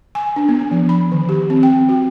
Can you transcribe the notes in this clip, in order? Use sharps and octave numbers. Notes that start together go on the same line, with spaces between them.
G#5
D4
B3
F3
B5
D#3
G4
C4
G5
F#4